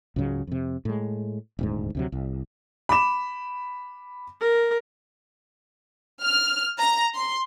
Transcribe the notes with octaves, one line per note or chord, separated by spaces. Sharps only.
C#2 G#2 C#3 F#3
F2 C3
A2 G#3
D#1 D2 G#2
D2 C3 F#3
C2
B5 D6 E7
A#4
F6
A#5
C6